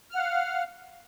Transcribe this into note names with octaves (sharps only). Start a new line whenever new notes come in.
F5 F#5 F6